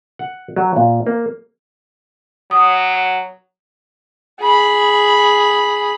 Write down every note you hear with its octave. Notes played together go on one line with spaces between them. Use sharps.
F#5
F#3
A#2
A#3
F#3 D#6
G#4 B5